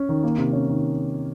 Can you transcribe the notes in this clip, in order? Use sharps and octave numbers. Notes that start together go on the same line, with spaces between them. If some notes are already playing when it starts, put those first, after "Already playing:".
Already playing: C#4
D#3
A#3
C3
C#4
D#3